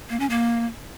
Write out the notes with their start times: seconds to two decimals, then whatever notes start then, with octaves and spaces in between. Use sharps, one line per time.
0.10 A#3
0.20 C#4
0.30 A#3